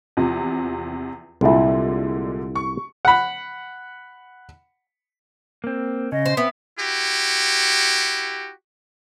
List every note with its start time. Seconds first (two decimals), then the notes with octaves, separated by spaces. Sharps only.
0.17 E2 C3 F3
1.41 C2 A#2 D3 G#3 E4
2.55 C#6
3.05 F#5 B5
5.64 A#3 C4
6.12 C#3 D#5
6.26 C5
6.37 B3 C4 E5
6.79 E4 F#4 G4